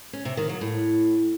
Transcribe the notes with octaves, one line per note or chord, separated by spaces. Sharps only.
C#4
C3
D#3
F#3
A2